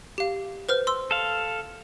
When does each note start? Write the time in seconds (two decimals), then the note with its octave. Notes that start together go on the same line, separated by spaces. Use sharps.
0.18 G4 F5
0.69 B4 C5 F6
0.87 C6 E6
1.11 A4 F5